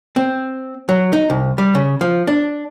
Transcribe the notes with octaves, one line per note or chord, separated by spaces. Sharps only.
C4
F#3
D#4
C2
G3
C#3
F3
D4